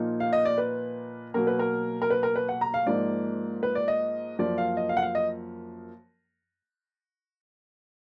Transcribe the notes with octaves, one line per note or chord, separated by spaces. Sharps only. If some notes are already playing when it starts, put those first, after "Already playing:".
Already playing: A#2 F3 A#3 D#4
F5
D#5
D5
B4
B2 F#3 A#3 A#4
B4
A#4
A#4
B4
A#4
B4
F#5
A#5
F5
G#2 F3 A#3 D#4 D5
B4
D5
D#5
F#2 F3 A#3 D5
F5
D#5
F5
F#5
F5
D#5